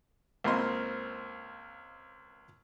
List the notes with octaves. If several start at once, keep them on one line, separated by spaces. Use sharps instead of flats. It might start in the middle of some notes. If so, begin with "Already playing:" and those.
C#2 A#3 C4 D#5 B5 C6